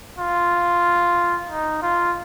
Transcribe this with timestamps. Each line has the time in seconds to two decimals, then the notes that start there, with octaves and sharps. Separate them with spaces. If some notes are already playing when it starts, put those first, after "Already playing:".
0.18 F4
1.49 D#4
1.82 F4